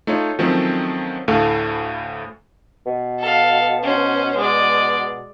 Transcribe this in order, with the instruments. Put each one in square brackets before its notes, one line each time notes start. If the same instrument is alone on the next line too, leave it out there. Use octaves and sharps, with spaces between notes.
[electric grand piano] A3 D#4 F4 C#5
D#3 F3 F#3 A3 C4 C#4
D2 A2 A3 A4 F5
[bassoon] B2
[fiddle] A4 F5
C#4 C5
G#3 D5